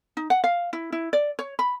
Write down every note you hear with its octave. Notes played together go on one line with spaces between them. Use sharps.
D#4
F#5
F5
E4
E4
D5
C#5
B5